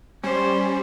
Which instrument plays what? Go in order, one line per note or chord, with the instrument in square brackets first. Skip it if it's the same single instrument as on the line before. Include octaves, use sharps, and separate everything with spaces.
[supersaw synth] G3 [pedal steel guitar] C#4 [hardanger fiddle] C5